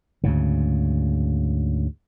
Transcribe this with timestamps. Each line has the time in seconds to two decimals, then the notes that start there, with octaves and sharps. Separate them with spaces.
0.24 D2 G#2 C#3